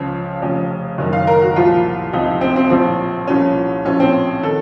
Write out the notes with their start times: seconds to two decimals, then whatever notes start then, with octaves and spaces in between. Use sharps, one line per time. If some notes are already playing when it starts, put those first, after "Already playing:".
Already playing: C#2 C#3 F3
0.41 F1 F2 C#3
0.98 F#1 F#2 D#3
1.13 F5
1.27 A#4
1.41 F#4
1.56 C2 A#2 F3 F4
2.13 C#2 C3 F3 D#4
2.41 C4
2.56 C4
2.70 A#1 A2 F3 C4
3.27 C2 A#2 F3 C#4
3.85 A#1 A2 F3 C#4
4.00 C4
4.43 D#3 A4